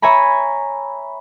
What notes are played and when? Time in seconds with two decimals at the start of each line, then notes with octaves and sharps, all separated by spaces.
0.02 C#5 E5 G#5 A#5 B5